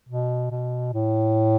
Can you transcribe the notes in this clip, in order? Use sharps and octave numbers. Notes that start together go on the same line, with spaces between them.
B2
B2
A2